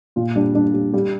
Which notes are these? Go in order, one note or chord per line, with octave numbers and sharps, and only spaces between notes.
A#2 F4
G3 D4
G3 D4
G3
G3 G4